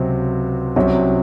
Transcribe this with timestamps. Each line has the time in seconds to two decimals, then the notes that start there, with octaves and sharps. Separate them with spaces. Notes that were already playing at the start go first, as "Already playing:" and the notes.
Already playing: C#2 C3 F#3 C4 F#4
0.76 C2 C3 F#3 C#4 F#4